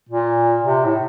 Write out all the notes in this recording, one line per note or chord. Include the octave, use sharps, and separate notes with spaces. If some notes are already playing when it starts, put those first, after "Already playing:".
A#2
C3
A2